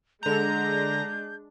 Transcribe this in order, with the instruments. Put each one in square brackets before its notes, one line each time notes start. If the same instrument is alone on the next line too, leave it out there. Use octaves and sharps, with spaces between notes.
[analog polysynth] D3 A#5 [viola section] G#3 D4 [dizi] G6